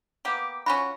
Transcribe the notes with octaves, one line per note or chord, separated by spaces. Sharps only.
A#3 B3 G4
C#4 F4 F#4 B5